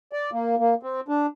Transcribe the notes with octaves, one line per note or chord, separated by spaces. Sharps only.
D5
A#3
A#3
C4
D4